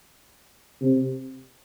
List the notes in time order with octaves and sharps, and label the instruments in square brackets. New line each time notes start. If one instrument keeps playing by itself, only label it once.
[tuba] C3